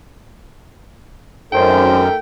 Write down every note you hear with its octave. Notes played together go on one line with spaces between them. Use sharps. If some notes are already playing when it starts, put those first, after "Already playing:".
G#1 F#2 A3 C#4 D#4 A#4 C5 G5